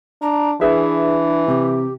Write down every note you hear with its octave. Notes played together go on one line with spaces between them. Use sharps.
D4 A#5
E3 D4 G#4 B4 E5
C3 G4